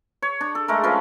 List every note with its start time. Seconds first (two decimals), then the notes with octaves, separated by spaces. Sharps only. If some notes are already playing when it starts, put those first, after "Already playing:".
0.22 C#5
0.41 D4
0.55 A4
0.68 G#3 A3 A#4
0.83 F3 C#4 B4 F5